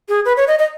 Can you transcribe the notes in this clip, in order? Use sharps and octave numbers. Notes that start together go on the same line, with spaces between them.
G#4
B4
C#5
D#5
D#5